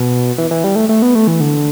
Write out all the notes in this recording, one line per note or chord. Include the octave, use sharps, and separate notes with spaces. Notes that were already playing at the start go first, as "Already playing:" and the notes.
Already playing: B2
E3
E3
G3
A3
A3
B3
A3
E3
D3